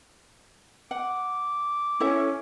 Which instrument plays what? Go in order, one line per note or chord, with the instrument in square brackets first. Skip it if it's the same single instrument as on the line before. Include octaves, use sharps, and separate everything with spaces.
[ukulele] F#5 [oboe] D6
[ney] C#4 [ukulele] E4 A4 E5